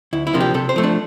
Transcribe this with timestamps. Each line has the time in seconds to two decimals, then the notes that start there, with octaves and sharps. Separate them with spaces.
0.13 D2 E4
0.27 E4
0.33 C3 F3 A#3 D4
0.41 G4
0.54 C3 A4
0.69 C5
0.76 F3 A3
0.83 D4